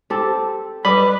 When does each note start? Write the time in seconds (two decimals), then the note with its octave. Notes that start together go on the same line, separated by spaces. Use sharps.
0.10 C4 G4 A4
0.85 G3 B4 D#5 B5